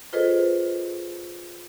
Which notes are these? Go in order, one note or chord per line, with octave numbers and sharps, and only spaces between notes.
F4 G#4 A4 B4 C5 D#5